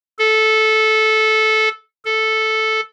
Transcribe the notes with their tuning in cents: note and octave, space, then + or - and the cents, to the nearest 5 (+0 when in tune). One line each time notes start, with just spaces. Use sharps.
A4 -15
A4 -5